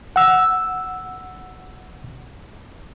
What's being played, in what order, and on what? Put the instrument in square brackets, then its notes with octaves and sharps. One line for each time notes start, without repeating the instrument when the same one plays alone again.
[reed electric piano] F#5 E6